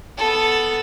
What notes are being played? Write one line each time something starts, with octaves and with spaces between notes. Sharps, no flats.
B3 A4